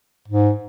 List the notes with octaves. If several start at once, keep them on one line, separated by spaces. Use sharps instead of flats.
G#2